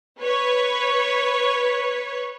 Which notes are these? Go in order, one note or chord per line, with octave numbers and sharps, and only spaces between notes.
B4 C#5